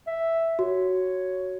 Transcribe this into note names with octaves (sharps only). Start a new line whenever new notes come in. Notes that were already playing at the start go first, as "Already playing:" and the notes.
E5
F#4 C#5